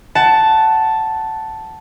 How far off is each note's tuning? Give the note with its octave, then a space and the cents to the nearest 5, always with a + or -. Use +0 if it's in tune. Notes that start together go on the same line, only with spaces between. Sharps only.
F#5 +20 A5 +0